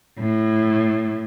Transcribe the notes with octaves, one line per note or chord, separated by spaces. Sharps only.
A2